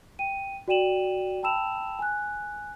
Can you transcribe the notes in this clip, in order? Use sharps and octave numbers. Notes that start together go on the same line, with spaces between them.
G5 D#7
F#4 D5 G5 D#7 E7 F#7
G5 A5 B5 E6 E7 F7
G#5 F#6